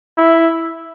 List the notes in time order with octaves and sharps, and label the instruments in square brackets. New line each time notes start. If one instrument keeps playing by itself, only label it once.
[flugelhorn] E4